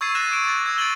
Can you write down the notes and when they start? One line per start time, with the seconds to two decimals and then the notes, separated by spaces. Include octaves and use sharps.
0.01 C#6 E6 G#6 A6 C7 D#7
0.15 F#6 A6 A#6 E7
0.31 D6 D7 E7
0.45 D6 A6
0.66 E6 G#6
0.78 A6 A#6 D7 D#7 F#7 G7